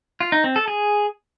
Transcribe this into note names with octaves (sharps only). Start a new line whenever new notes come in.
F4
D#4
C4
A4
G#4